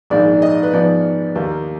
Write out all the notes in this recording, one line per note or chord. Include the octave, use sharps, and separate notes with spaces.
A#1 G#2 D#3 D5
D#5
B4
G#2 F3 B3 D5
D#2 D#3 A#3